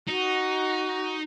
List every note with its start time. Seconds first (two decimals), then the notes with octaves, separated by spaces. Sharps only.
0.07 D#4 F#4